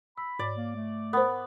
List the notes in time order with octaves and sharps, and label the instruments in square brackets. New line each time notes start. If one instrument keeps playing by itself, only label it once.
[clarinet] B5 [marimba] E6
[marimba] G#2 [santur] D5
[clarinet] A#3
A3
[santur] B3 [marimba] A#4 C5